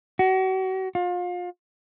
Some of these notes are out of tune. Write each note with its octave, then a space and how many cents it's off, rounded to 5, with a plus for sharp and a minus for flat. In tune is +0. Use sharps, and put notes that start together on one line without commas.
F#4 +35
F4 +30